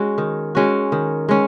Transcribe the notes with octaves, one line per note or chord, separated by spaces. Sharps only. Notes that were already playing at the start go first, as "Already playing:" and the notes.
Already playing: G#3 C#4 F#4
D#3
G#3 C#4 F#4
D#3
G#3 C#4